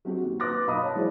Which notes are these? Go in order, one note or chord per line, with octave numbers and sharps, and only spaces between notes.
F#3 C4 F#4 G4
D#2
B4 C6 D6 F#6 A6 A#6
B1 D#5 F5 B5 D#6
C#5 A5
E3 F#3 G#3 C5 D5